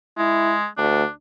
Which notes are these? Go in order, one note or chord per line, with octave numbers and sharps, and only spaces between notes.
G#3 E4
D2 D4